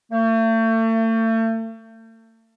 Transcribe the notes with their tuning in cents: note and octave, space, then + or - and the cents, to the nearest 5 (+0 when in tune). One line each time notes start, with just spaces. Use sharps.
A3 +40